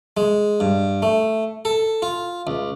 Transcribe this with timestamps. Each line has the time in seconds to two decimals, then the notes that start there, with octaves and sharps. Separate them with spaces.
0.17 G#3
0.60 G2
1.02 A3
1.65 A4
2.02 F4
2.47 C#2